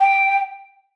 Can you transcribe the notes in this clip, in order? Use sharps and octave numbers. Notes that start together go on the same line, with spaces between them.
G5